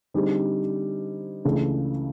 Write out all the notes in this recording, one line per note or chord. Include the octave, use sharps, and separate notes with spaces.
D3 G3 C4 D#4 G#4
C#2 C#3 E3 A3 D4